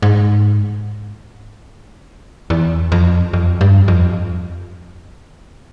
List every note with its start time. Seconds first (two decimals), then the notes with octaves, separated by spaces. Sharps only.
0.02 G#2
2.50 E2
2.92 F2
3.33 F2
3.61 G2
3.88 F2